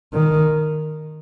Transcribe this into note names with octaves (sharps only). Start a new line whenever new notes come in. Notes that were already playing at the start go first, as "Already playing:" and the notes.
D#3